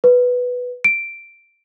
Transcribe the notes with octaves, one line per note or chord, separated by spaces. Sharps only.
B4
D7